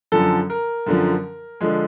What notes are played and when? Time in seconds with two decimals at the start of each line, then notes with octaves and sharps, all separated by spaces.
0.12 F#2 D3 F3 A4
0.50 A#4
0.86 F#2 D3 F3
1.61 D3 F3 G#3